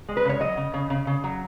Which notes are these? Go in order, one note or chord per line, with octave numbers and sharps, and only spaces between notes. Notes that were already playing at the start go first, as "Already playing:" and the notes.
G#3
B4
C#3 C#5
F#3 D#5
C#3
C#3
C#3
C#3
F#3